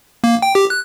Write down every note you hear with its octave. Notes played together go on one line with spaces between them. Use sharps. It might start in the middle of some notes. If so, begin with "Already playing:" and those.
A#3
G5
G4
F#6